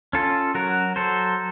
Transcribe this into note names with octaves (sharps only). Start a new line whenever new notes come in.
C#4 F4 A4
F#3 F#4 A#4
F#3 A4 C5